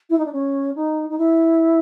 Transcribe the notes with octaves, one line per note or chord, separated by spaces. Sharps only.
E4
D#4
D4
C#4
D#4
D#4
E4